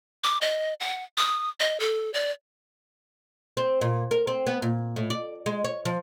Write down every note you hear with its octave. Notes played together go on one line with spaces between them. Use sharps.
D6
D#5
F#5
D#6
D#5
A4
D5
C4
A#2
A#4
C4
B3
A#2
A2
D5
G#3
C#5
F3